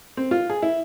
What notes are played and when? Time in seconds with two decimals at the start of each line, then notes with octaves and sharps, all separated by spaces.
0.17 C4
0.31 F4
0.50 G#4
0.62 E4